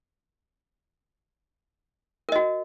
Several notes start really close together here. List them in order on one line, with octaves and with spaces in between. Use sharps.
A#4 D#5 F#4